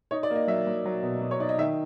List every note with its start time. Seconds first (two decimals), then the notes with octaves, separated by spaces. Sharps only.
0.11 D#4 C#5
0.23 D5
0.30 A#3
0.36 D#5
0.48 F#3 E5
0.67 F#3
0.85 F#3
1.03 B2
1.21 B2
1.31 C#5
1.40 D#4 D5
1.49 D#5
1.58 D#3 E5